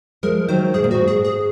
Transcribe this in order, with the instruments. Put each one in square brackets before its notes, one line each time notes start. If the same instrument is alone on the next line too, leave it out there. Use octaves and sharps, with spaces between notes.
[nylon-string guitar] F3 G#3 [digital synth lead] A#4
[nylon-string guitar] D#3 F#3 [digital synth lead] C5
[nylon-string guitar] G#2 [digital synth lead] G#4
[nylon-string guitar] A#2
[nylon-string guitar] G#2 [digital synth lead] F#4
[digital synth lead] G#4
G#4